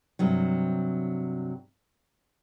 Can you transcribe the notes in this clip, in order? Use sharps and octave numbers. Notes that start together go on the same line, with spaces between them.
G2 C3 F#3